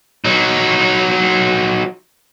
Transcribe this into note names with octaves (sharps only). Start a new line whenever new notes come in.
F#3 D#4